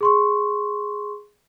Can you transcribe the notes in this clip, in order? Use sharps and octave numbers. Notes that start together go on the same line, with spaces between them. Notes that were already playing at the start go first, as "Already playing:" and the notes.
G#4 C6 C#6